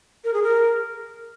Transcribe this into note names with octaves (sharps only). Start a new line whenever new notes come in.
A#4
G#4
A#4